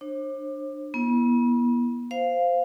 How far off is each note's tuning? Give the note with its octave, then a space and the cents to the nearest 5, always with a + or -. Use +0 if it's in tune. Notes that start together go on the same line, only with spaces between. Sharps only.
D4 +20 C5 +45
B3 -40 E4 +5
C5 -10 F5 +0